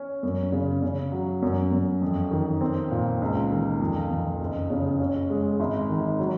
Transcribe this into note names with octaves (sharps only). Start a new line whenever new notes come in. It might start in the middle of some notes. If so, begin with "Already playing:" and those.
Already playing: C#4
F#2
C#3
C#3
F#3
F#2
F#2
F2
D#3
C4
A#2
C#2
D#3
F2
F2
F#1
C#3
C#4
G#3
G#1
D#3
F#3